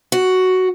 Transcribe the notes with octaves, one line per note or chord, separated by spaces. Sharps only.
F#4